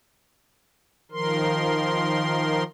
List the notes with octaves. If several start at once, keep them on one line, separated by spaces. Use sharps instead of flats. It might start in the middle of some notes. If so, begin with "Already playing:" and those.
D#3 F3 A#4 C6